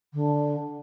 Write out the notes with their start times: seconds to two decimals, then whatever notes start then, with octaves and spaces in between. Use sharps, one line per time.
0.13 D3